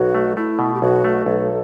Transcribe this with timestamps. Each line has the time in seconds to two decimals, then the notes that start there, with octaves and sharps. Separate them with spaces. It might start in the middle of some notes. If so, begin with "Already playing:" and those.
Already playing: B1 F#4
0.15 A3
0.36 A3 E4
0.59 B2
0.74 G4
0.82 B1 F#4
1.04 A3
1.26 B1 A4